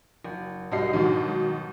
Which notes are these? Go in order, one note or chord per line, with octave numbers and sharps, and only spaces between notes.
F#1
C2 F#3 G3 D#5 C7
G#2 B2 D#3 F#3